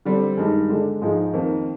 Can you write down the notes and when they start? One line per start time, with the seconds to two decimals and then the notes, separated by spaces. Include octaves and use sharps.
0.05 D3 G3 C4
0.37 G2 D#3 G#3 D#4
0.69 D3 G#3 D4
1.02 G#2 F3 G#3 D#4
1.33 F2 D#3 A#3